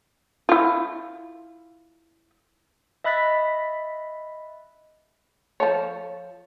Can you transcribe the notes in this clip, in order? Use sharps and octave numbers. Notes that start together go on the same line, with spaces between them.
E4 F4
D#5 E5 B5 F#6 A6 B6
F3 A4 C#5